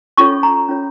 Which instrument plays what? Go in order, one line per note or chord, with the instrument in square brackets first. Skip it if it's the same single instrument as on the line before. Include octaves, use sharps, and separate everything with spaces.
[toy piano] C#4 F4 A4 C#5 C#6
A#5
C#4 F4 A4 C#5